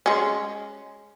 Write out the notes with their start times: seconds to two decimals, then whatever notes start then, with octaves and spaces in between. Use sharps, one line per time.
0.06 G#3 C#4